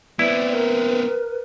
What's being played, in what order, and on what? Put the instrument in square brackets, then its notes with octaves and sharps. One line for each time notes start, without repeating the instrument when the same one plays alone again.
[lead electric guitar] B3 C4 [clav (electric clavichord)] E4 [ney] B4 [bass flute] D5
[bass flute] A#4